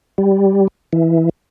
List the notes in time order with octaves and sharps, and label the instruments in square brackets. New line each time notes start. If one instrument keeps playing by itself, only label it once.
[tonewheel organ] G3
E3